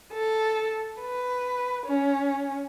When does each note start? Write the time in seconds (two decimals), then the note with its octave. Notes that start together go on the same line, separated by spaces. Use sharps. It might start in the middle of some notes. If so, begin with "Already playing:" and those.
0.13 A4
1.00 B4
1.85 C#4